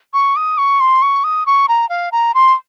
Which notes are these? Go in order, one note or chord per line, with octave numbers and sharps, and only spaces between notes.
C#6
D#6
C#6
C6
C#6
D#6
C#6
A#5
F5
A#5
C6